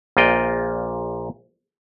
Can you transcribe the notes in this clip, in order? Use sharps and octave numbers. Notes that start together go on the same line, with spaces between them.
A#1 A#2 F4 D#5 G5